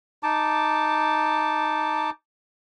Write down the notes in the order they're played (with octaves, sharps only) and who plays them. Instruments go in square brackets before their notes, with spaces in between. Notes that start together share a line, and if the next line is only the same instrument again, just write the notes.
[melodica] D#4 A5 D6